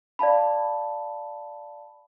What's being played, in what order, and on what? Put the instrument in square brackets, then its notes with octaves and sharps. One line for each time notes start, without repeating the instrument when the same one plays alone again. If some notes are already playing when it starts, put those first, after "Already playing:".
[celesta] D5 F5 A5 B5